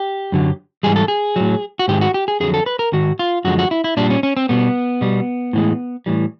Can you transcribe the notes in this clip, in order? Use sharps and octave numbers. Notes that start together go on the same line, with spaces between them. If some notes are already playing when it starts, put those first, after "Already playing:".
Already playing: G4
F#2 D3 F#3
G#2 E3 G3 G#4
A4
G#4
A2 F#3
F#4
G#2 D#3 G#3 G4
F#4
G4
G#4
F2 D3 F#3 G#4
A4
B4
A#4
G#2 D#3 F#4
F4
F#2 D3 F3 G#3 F#4
F#4
E4
E4
A#2 G3 D4
C#4
C#4
C4
B2 G3 B3
B2 G3
A2 E3 G#3
A2 E3 G3